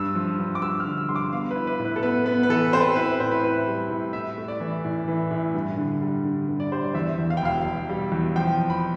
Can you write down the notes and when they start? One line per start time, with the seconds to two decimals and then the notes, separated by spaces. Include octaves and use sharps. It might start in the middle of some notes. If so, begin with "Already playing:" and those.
Already playing: G2 E6
0.15 F3
0.39 G2
0.55 D6
0.62 G2 E6
0.80 F6
0.85 D3
0.97 E6
1.09 G2 C6
1.16 D6
1.32 B3 F5
1.51 B4
1.56 E4
1.67 B4
1.79 A2
1.85 B4
1.96 A4
2.03 B3 B4
2.26 B3 B4
2.43 B4
2.49 E3 A4
2.73 C4 C5
2.81 B4
2.88 A4
2.96 E4 B4
3.08 B4
3.20 A2 C5
3.31 B4
3.43 E4 B4
3.67 G3
3.90 A2
4.13 E4 E5
4.38 A3
4.48 D5
4.60 E3
4.85 A2
5.08 E3
5.31 A2
5.54 G2
5.77 D3
6.02 G3
6.25 D3
6.48 G2
6.60 D5
6.71 G3 C5
6.84 D5
6.94 E2 E5
7.18 E2
7.30 F5
7.37 G5
7.42 E1 F5
7.66 E1
7.89 G3
8.12 E2
8.36 F3 G5
8.58 F2
8.70 B5